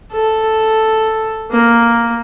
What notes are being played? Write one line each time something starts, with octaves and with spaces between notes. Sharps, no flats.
A4
A#3